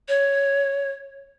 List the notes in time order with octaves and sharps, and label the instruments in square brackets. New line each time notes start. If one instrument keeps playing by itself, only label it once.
[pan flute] C#5